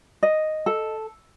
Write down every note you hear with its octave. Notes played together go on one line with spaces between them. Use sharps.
D#5
A4